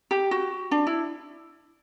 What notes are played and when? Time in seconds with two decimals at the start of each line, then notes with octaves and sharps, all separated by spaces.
0.11 G4
0.31 F#4
0.71 D4
0.87 E4